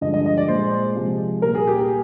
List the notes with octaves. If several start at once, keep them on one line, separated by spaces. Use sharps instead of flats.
G2 D3 F3 G#3 D#5
D#5
D#5
D5
A#2 G#3 C5
C3 F3 G#3
A#2 G3 A#4
G#4
G4
G#4